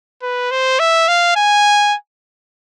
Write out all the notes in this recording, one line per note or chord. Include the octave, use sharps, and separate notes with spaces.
B4
C5
E5
F5
G#5